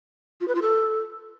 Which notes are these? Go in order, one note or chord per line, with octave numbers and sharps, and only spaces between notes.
F4
B4
F4
A4